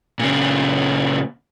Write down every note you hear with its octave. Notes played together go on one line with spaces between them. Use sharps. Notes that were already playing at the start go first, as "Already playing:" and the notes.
A#2 C#3